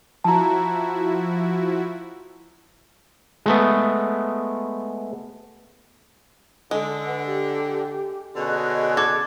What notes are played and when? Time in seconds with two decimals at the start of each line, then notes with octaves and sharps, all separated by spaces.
0.24 F3 E4 F#4 A5 A#5
3.46 G#3 A3 B3
6.71 D3 G#3 A4
7.06 B4 F#5
7.25 G4
8.36 B2 D3 C#4 G#4 D#5 F#6
8.97 A4 D6 G#6